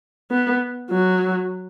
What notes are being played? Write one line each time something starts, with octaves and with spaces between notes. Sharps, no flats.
B3
F#3